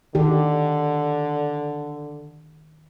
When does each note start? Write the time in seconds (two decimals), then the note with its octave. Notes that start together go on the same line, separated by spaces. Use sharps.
0.15 D3 D#3 G4